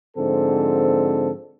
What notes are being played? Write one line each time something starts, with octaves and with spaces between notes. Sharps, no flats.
G#2 D3 F3 C4 A4